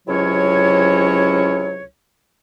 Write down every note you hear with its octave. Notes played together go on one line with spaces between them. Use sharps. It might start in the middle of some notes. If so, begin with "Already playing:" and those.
C#2 C3 F#3 C#4 E4 C#5